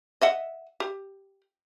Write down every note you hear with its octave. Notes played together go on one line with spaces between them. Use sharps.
D#5 E5 F#5
G4